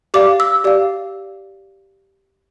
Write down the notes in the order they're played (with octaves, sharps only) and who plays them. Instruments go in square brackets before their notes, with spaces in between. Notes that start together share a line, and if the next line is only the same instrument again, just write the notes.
[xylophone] G4 D5 F5 D6
E6
G4 D5 F5